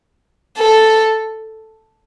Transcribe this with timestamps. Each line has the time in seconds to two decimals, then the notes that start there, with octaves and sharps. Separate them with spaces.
0.58 A4